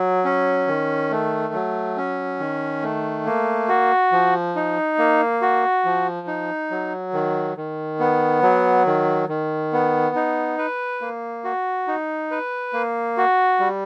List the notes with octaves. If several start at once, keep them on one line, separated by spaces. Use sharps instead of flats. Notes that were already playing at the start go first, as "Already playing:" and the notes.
Already playing: F#3
C#4
D#3
A3
F#3
C#4
D#3
A3
A#3
F#4
F3
D#4
A#3
F#4
F3
D#4
F#3
D#3
D#3
B3
F#3
D#3
D#3
B3
D#4
B4
A#3
F#4
D#4
B4
A#3
F#4
G3